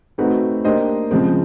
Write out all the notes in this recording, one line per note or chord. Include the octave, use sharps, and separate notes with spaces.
A3 C4 D#4 F#4 B4
A#3 D4 G4 C5 D#5
C#3 F3 G#3 C4